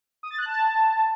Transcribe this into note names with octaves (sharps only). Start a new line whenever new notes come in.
D#6
A6
F#6
A5